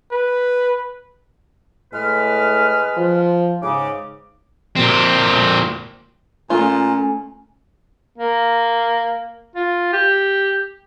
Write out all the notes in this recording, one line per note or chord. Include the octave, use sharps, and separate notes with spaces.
B4
A2 G#3 B4 F6
F3
G#2 C#3 D6
A#2 C4
A#2 A3 C#4 F4
A#3
F4
G4